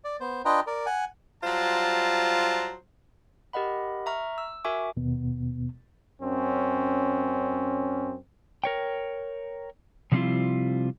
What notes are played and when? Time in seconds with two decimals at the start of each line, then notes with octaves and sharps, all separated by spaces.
0.04 D5
0.20 B3 C5
0.45 D4 F4 B4 D#5 G5 A#5
0.67 A#4 D5
0.86 F#5 G#5
1.43 F#3 G3 F4 C5 A5 A#5
3.53 G4 A#4 D#5 F#5 B5
4.06 E5 A#5 C#6 F6
4.38 E6
4.65 F#4 A#4 E5 G#5 C#6 D6
4.97 D#2 B2 B3
6.22 F#2 C4 C#4
8.64 A#4 C#5 G5
10.12 C3 F3 G3 C4 E4 F4